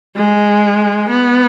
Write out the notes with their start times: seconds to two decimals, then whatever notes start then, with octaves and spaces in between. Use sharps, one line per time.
0.16 G#3
1.09 B3